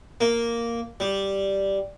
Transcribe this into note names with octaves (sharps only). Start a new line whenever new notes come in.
A#3
G3